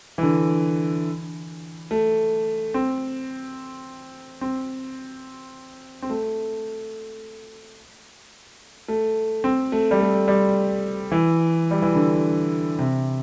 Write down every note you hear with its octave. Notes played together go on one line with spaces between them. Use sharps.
E3
D3
A3
C4
C4
C4
A3
A3
C4
A3
G3
A3
G3
E3
G3
E3
D3
C3